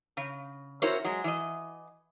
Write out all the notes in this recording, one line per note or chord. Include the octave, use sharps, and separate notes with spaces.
C#3
C#4 E4 F#4 A#4 C5 C#5
F#3 G#3
E3 D#5